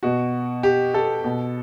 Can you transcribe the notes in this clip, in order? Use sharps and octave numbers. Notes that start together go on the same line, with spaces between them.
B2 F#4
G4
A4
B2